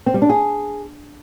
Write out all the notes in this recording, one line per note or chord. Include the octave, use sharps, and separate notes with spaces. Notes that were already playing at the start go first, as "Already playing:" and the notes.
C4
G3
D4
G#4